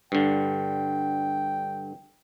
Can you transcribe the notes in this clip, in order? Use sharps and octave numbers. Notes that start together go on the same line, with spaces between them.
G2 D3 G5